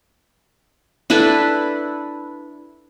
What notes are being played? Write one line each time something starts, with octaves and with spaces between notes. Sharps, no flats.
D4 E4 A4 B4